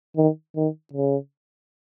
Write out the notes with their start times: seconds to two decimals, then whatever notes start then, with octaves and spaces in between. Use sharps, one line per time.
0.17 D#3
0.56 D#3
0.93 C#3